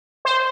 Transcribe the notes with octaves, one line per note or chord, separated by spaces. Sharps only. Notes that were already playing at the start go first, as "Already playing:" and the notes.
C5